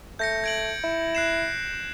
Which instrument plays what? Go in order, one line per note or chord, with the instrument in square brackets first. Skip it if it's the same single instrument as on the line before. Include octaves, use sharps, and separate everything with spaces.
[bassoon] A3 [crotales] G6 A#6 C#7
[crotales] G#6 D7 F#7
[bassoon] E4
[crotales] F#6 C7 E7